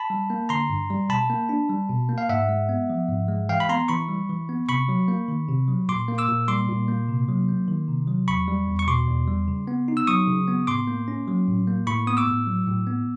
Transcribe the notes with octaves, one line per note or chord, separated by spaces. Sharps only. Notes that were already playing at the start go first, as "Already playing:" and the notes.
Already playing: A5 B5
G3
A#3
D3 A#5 C6
G2
G3
B2 A5 B5
A#3
D4
G3
B2
A#3
F5
G#2 E5 F#5
G#3
B3
F3
G#2
G#3
E3 F5 G5
B5
B3 A#5 C6
E3 B5 C#6
G3
E3
B3
C3 B5 C#6
F#3
A#3
D#3
C3
F#3
A#2 C6 D6
A#3
D6 E6
A#2
G3 C6 D6
A#2
A#3
C3
F#3
A#3
D#3
C3
F#3
E2 B5 C#6
G3
E2
C#6
B2 C6 D6
E2
G3
C#3
B3
D#4
E6
F#3 C#6 D#6
C#3
B3
A2 C6 D6
A#3
C#4
F#3
A2
A#3
A2 B5 C#6
B3 D#6
D6 E6
A2
F#3
A2
B3